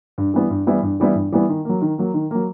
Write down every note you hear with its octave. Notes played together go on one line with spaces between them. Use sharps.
G2
E3 G3 B3 E4
G2
E3 G3 B3 E4
G2
E3 G3 B3 E4
G2
E3 G3 B3 E4
D#3
F#3 A#3
D#3
F#3 A#3
D#3
F#3 A#3